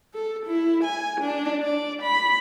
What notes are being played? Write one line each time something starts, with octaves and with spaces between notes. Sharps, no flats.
A4
E4
G#5
D4
D5
B5